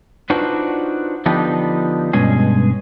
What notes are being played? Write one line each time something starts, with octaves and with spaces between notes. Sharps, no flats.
D4 D#4 F4 F#4 B4 C5
D3 F3 B3 D4 D#4 G4
G2 B2 G#3 C#4 G#4